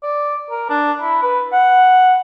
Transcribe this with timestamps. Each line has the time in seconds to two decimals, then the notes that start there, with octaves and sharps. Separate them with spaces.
0.03 D5
0.51 A#4
0.70 D4
1.01 E4
1.23 B4
1.53 F#5